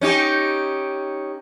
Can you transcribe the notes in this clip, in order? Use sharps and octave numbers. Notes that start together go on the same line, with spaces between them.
C#4 D#4 G4